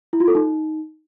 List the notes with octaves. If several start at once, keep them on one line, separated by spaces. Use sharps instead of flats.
E4
F4
A4
D#4